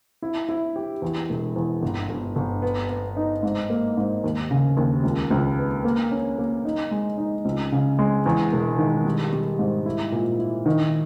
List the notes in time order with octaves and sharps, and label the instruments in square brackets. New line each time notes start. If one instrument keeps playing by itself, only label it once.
[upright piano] E4
E4
G4
E2
E1
E2
G1
G1
G1
B3
B3
D#4
G#2
A#3
G#2
D#2
C#3
D#2
C#2
C#2
B3
A#3
C#4
A#3
D#4
G#3
D#4
C#2
C#3
G#3
E2
E1
D#3
G3
G3
G#2
E4
A#2
E4
D#3